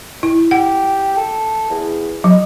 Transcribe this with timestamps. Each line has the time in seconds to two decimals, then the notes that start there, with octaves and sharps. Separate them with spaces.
0.23 E4
0.51 G4 F#5
1.17 A4
1.70 E2
2.24 F#3 D#4